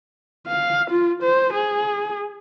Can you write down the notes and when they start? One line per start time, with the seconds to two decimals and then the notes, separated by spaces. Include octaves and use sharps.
0.47 F5
0.91 F4
1.23 C5
1.53 G#4